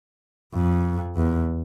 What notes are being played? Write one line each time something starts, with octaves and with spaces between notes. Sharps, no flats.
F2
E2